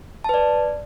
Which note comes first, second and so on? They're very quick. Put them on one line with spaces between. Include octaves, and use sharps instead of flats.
A5 B4 D5